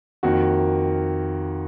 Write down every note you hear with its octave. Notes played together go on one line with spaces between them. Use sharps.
F2 D#3 A#3 F#4